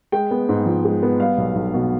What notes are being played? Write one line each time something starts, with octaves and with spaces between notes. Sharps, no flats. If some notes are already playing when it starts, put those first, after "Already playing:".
G#3 G5
B3
G#2
F3
G#3
B3
G3 F5
B1
B1
B2